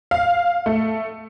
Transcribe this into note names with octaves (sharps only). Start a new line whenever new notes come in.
F5
A3